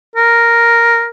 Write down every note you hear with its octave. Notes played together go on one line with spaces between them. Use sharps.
A#4